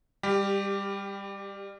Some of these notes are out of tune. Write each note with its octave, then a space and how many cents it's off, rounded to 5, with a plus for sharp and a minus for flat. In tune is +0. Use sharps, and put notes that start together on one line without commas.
G3 +25 G4 +0